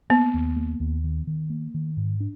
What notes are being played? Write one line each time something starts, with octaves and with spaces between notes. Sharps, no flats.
A#3 B3
D#2
A#3
D#2
D#3
D#3
A#3
D#3
G#2
D4